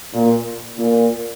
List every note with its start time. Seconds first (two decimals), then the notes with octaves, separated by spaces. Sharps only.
0.14 A#2
0.78 A#2